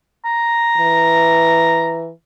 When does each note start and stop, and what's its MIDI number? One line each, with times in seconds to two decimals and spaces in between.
0.25 2.05 82
0.78 2.10 52